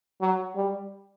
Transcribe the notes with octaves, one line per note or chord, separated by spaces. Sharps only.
F#3
G3